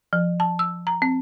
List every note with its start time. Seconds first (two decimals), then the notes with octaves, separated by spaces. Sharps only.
0.13 F3
0.40 A5
0.59 E6
0.87 A#5
1.02 C4